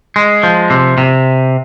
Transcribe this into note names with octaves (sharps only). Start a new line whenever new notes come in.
G#3
F3
C3
C3